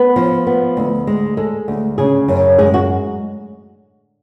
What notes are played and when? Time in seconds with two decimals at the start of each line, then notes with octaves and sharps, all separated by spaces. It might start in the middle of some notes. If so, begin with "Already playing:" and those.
Already playing: B3 B4
0.16 F3
0.47 B3
0.77 D2
1.07 G#3
1.37 G#3 A4
1.68 D2
1.98 C#3 G#4
2.28 F#2
2.58 G#3 G#4
2.74 F#4